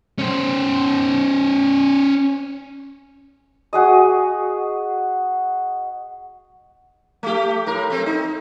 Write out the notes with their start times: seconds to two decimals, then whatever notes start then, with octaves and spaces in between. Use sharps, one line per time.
0.18 C#4 C5
3.73 F#4 G#4 D#5
7.23 A3 G4
7.66 A2 A#4
7.90 A3 C4
8.06 D#4